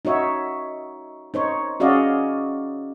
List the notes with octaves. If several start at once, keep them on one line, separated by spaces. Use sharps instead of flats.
D#4 F#4 C#5 E5
D#4 C5 C#5
C#4 F#4 G#4 D5 D#5 F5